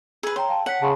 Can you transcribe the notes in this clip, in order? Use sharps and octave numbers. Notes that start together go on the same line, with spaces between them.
G#4 B4 E6
C#5 G5 A#5 C6
F5 G5 A5
C#5 F#5 B6
C#3 A5 C6